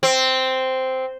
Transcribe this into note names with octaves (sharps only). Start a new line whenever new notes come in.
C4